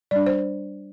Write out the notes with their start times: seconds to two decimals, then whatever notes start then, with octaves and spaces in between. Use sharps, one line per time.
0.11 G3 D4 D5
0.26 C5